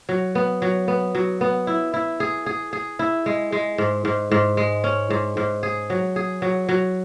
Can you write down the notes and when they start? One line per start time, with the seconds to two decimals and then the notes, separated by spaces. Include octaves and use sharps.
0.09 F#3
0.35 B3
0.62 F#3
0.88 B3
1.15 F#3
1.41 B3
1.67 E4
1.94 E4
2.20 G#4
2.46 G#4
2.73 G#4
2.99 E4
3.26 G#3
3.52 G#3
3.78 G#2
4.05 G#2
4.31 G#2
4.57 G#3
4.84 C#4
5.10 G#2
5.37 G#2
5.63 G#4
5.90 F#3
6.16 G#4
6.42 F#3
6.69 F#3